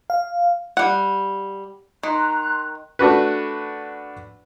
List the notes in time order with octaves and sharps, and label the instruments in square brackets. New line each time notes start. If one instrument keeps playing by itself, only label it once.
[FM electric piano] F5
[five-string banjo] G3 F#5
[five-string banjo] D#3 [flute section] A#5 C6 F#6
[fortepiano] A3 D4 F#4 B4